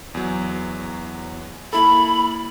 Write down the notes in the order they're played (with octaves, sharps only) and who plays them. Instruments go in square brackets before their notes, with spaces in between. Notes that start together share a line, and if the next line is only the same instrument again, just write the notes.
[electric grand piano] E2 F#3
[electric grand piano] A#3 E4 A4 [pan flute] B5